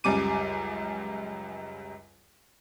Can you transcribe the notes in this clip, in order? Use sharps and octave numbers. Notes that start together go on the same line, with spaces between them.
C#2 F#2 G3 D6 D#7